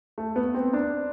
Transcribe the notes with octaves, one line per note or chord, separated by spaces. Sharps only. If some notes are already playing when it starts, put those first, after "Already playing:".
A3
B3
C4
D4